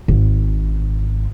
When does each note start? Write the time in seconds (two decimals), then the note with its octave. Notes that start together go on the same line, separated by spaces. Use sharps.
0.08 G#1